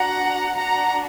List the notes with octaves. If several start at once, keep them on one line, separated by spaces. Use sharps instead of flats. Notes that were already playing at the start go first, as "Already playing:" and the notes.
Already playing: D4 F#4 F#5 A#5
D4 F#4 F#5 A#5